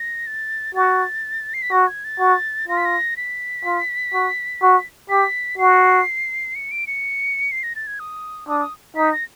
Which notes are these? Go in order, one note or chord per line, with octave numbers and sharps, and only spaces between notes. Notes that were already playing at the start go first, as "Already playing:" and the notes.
Already playing: A#6
A6
F#4 A6
C7
B6
F#4 A#6
G#6
A6
F#4
F4 A#6
B6
A#6
B6
F4
F#4
F#4
G4 B6
F#4 C7
C#7
D7
C#7
C7
A#6
A6
G#6
D#6
D4 D#6
D#6
D#4 B6
A#6